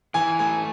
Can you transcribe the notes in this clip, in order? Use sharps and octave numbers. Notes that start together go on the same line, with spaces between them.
E3 G#5
A3 G#5